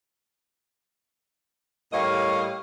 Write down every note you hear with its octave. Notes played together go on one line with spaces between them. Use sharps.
A2 G3 A#3 C#5 D#5 F5